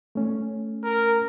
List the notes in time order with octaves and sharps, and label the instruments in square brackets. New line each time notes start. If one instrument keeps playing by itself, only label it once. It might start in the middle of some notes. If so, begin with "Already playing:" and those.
[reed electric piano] A3 C#4
[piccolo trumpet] A#4